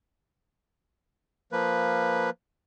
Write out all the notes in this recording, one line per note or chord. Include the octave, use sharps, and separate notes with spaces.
F3 A#3 B4